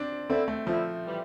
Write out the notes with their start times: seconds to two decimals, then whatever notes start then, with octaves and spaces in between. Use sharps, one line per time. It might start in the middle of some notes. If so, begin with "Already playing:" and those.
Already playing: C4 D4
0.29 D3 A3 C4 E4
0.48 A3
0.67 D3 F3 A3 E4
1.05 E3 G3